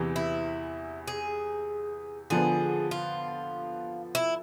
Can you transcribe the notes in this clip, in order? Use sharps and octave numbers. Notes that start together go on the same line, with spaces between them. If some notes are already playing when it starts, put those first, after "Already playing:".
Already playing: E2 C3 E3
E4
G#4
D3 F3 B3 G#4
F4
E4